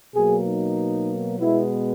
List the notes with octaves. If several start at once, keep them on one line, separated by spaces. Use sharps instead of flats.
B2 F#3 A#3 G#4
D#4
B2 G#3 B3 E4